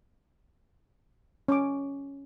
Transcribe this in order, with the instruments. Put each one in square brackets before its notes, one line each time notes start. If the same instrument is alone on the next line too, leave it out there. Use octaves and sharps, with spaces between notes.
[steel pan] C#4 D6